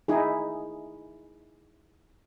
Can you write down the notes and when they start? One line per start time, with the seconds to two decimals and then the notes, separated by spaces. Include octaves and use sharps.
0.08 D#4 E4 G#4